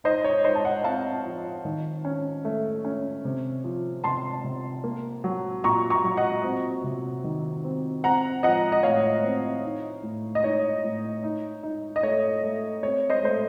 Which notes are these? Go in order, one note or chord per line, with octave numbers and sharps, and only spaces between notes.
D#4 C5 D#5
C#5
D#4 C5 D#5
A5
D#5 F#5
C4 F5 A5
F3
D#3
C#4
A3
C#4
C3
F3
C3 A5 C6
C3
A#3
F#3
A#2 A#5 C#6
A#5 C#6
F#3
D#5 F#5
C4
C3
D#3
C4
C4 F#5 A#5
F3 D#5 F#5
D#5
A2 C#5 F5
C4
D#4
A2
D#5
D#4 C#5
A2
D#4
D#4
D#5
A3 C#5
A3
C4 C#5
C5 D#5
A3 C5